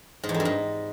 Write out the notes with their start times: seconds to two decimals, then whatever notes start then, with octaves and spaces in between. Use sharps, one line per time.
0.23 G#2
0.29 E2
0.34 F2
0.40 G2
0.45 G#2